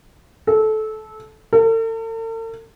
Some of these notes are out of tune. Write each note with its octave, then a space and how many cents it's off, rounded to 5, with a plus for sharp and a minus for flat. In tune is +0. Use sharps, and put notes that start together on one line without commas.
A4 -20
A4 +45